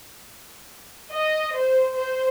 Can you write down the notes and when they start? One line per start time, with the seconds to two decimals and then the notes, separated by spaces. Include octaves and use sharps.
1.10 D#5
1.55 C5
1.95 C5